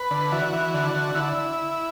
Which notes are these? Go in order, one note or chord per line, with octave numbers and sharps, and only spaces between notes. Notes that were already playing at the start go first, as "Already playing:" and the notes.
Already playing: B4
D3
E3 F#4
E3
D3
D3
D3 E4